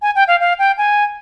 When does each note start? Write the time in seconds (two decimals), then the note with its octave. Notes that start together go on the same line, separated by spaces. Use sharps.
0.02 G#5
0.15 G5
0.28 F5
0.40 F5
0.59 G5
0.78 G#5